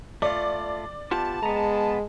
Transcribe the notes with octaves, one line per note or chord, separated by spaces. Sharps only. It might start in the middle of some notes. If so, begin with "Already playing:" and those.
A3 F4 D5
B3 F4 G4 A5
G#3 B3 A#5